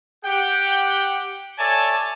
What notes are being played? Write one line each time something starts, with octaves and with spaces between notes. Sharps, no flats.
G4 F#5 G5
A4 C#5 D5 E5 G#5 A5